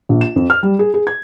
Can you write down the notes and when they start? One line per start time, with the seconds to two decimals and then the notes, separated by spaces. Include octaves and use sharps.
0.09 A#1
0.21 E7
0.36 F2
0.50 F6
0.63 G3
0.79 G#4
0.94 G#4
1.07 G#6